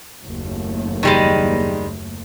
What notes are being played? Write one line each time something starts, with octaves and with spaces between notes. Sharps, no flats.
F#1 D#2 A3
D#3 G3 G#3